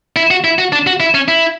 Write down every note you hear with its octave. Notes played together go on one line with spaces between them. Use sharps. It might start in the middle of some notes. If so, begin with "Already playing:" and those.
E4
F#4
E4
F#4
D4
F#4
E4
C#4
E4